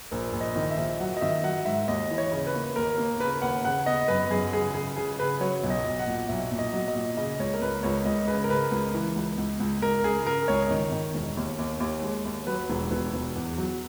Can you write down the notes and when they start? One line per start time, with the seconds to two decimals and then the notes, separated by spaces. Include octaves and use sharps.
0.11 A#1 A#4
0.33 A#1
0.41 D#5
0.56 D#3
0.70 E5
0.77 A#1
1.00 F#3 F#5
1.17 D#5
1.21 D#3 E5
1.43 F#3 F#5
1.65 G#2 E5
1.87 D#2 D#5
2.11 E3
2.18 C#5
2.31 C#3
2.47 B4
2.54 A#3
2.76 D#2 A#4
2.98 A#3
3.20 C#3 B4
3.42 D#2 F#5
3.64 C#3 F#5
3.86 B3 D#5
4.08 F#2 B4
4.30 F#2 G#4
4.53 C#3 G#4
4.74 C#3 G#4
4.97 C#3 G#4
5.19 C#3 B4
5.40 F#3 C#5
5.63 B1
5.70 D#5
5.85 B1
5.99 F#5
6.06 A#2
6.29 B1 E5
6.51 A#2
6.59 D#5
6.73 F#3
6.88 D#5
6.95 A#2
7.17 C#3 D#5
7.39 C#2 C#5
7.53 A#4
7.61 C#2 B4
7.83 C#2 C#5
8.05 C#2 D#5
8.28 C#3 B4
8.44 A#4
8.49 C#3 B4
8.71 C#2
8.94 E3
9.16 C#2
9.38 C#2
9.60 C#2
9.82 C#2 A#4
10.04 C#3 G#4
10.26 C#3 A#4
10.48 C#2 C#5
10.71 D#3
10.92 D#3
11.14 E1
11.37 D#2
11.58 D#2
11.80 D#2
12.02 G#3
12.25 D#2
12.47 F#3 B4
12.69 E1
12.91 E1 B4
13.13 E1
13.35 E2
13.58 F#3